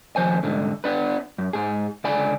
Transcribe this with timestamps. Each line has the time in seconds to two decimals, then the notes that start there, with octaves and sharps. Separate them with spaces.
0.16 D#2 F3 C5 G#5
0.43 C2 G#2 D3
0.84 B3 D4 B4
1.38 F#2
1.53 G#2 G#4
2.04 C#2 D3 D5 G#5 B5